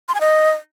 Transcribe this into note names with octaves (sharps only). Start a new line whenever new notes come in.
C6
G#5
D#5